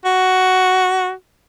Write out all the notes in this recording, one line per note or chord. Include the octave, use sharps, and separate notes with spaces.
F#4